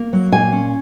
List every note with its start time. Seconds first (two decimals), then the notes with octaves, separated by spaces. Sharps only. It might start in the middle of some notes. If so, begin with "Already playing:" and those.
Already playing: A#3
0.13 F#3
0.32 A#2 G#5
0.52 C#4